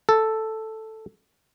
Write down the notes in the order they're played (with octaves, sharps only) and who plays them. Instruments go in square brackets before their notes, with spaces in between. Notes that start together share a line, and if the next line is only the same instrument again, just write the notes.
[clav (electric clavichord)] A4